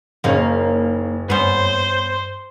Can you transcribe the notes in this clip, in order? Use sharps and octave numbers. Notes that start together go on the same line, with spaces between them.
F#1 C#3 A#3 C#4 D#4 C#5
G2 B3 C#4 C5